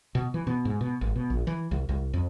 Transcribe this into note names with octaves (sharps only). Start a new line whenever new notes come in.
B2
E3
B2
G#2
B2
G#1
B2
A#1
E3
C2
C2
F2